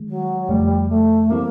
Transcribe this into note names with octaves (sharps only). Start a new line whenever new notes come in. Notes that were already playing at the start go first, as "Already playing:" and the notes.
Already playing: D#3 G#3
F#3
F2 C#3 F3 G3 A3
A3
E3 G3 A#3 C4 E4